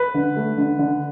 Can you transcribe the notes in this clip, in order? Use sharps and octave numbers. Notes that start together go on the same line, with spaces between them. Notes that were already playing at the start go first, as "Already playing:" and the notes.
Already playing: B4
D3
A3
D3
D3